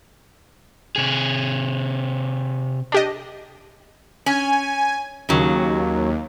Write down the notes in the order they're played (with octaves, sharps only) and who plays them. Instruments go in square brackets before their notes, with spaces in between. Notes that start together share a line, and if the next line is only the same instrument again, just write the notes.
[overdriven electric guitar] C3 G#4
[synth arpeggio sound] D4 G4 D#5
[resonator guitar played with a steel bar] C#4 [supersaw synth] G#5
[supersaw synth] D#2 [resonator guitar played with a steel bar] C#3 F#3